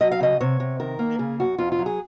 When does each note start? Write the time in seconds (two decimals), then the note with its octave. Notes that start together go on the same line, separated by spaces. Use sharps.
0.01 F#3 D#5
0.12 F5
0.20 C#3 D#5
0.41 C3 C#5
0.60 C3
0.80 D#3 A#4
0.99 A#3
1.19 C#3 G#4
1.40 F#2 F#4
1.59 F2 F4
1.72 F4
1.79 F#3
1.86 G#4